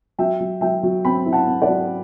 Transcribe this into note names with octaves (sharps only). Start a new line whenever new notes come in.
F#3 E5 G5
F#3
F#3 E5 G5
F#3
C4 G5 B5
E4
F#5 A5
C4
D5 F#5
F#3